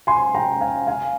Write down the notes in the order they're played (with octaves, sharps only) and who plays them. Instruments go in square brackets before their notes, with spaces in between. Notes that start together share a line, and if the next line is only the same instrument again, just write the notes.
[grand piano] G#5 C6
G5 A#5
F5 G#5
F5 G#5